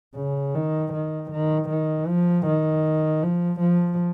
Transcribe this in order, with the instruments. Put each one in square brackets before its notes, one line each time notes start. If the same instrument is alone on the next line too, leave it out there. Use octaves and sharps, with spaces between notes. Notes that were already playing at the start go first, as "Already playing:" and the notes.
[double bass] C#3
D#3
D#3
D#3
D#3
F3
D#3
F3
F3